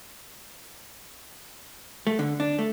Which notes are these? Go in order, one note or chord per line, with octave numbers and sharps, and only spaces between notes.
A3
D3
D4
A3